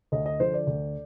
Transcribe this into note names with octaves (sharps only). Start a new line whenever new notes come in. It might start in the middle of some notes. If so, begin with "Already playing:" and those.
D2 D#5
D#5
D3 F3 C5
D5
D2